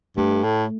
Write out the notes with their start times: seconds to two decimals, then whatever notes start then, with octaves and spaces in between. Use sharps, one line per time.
0.17 G2 A3
0.44 A2